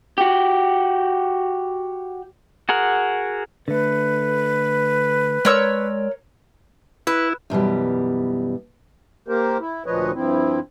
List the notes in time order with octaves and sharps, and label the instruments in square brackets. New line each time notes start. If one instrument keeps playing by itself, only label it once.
[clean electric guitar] F#4 G4
[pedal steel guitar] F#4 G#4 A#4 F#5
[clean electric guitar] D3 A3 [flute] B4
[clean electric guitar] G#3 D5 C6 [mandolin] A#4 C#5 E6
[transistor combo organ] E4 [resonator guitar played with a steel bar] B4
[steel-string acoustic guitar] F#2 B2 E3 G3
[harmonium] A#3 G4 A#4 C5
E4
D2 A#2 F3 B4 C#5 D#5
G2 F3 C4 E4